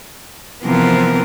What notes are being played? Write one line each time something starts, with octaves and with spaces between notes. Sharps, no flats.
C3 E3 F3 B3 C4 A#4